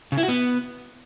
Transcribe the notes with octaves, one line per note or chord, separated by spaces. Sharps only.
C#3
E4
F#4
B3